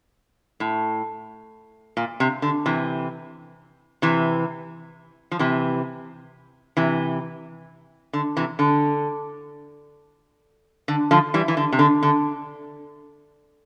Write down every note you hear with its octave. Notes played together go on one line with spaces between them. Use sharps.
A2
A#2
C3
D3
C3 E3
C3 E3
F3
C3 E3
C3 E3
D3
C3 E3
D3
D3
D3 F3
E3 G3
E3
D3
C3
D3
D3